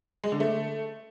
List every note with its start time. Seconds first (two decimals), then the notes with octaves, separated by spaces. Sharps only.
0.24 G#3
0.32 D3
0.40 A3